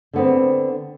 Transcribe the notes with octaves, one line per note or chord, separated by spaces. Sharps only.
D3 B3 C4